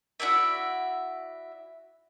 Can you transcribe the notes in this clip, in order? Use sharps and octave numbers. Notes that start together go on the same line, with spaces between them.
E4 F#4 D5 E5